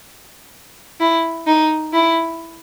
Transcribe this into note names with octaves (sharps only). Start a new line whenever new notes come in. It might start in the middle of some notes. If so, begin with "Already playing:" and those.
E4
D#4
E4